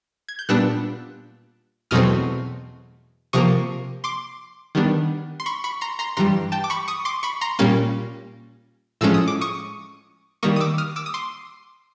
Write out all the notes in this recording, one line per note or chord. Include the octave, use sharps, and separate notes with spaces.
G#6
G6
A#2 G3 B3 D4 E6 F#6
E2 B2 F#3 A3 C4 D#6 F6
C3 F3 A#3 C#6 D#6
C6 D6
D#3 G3 B3 D4
C6
B5 C#6
B5 C#6
A#5 C6
A#5 C6
G2 E3 G3 A#5 C6
G5 A5
D6
B5 C#6
C#6 D#6
C6 D6
B5 C#6
A#5 C6
A#2 G3 A#3 C#4
A2 F3 G#3 C#4 E6
D#6
D6
C#6 D#6
D#3 G3 A#3 C#6 D#6
D#6
D6 E6
D#6 F6
D6 E6
D#6
C6 D6